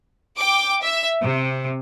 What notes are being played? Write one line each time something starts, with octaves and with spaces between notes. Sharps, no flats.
G5 D6
E5
C3